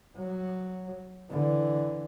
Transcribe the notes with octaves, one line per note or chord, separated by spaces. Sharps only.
F#3
D3 E3